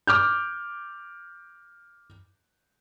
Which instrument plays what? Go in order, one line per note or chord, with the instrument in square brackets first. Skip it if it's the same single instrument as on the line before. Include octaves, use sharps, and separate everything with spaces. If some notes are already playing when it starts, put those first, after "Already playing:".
[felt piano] D6 F6 G6